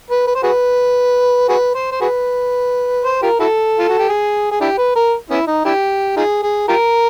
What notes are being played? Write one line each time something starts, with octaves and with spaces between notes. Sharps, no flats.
B4
B4
C5
F#4 G#4 B4
F#4 G#4 B4
C5
C5
F#4 G#4 B4
C5
F4 G4 A#4
E4 F#4 A4
F4
F#4
G4
G#4
G#4
D4 E4 G4
B4
A#4
B3 C#4 E4
D#4
D4 E4 G4
D#4 F4 G#4
G#4
F4 G4 A#4